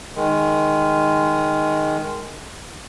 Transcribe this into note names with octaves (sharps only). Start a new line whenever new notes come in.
D#3 G#3